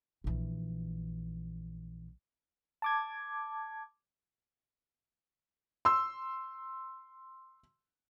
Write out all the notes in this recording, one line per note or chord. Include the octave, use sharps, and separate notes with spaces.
A#1 E3
A5 D6 G#6
C6 E6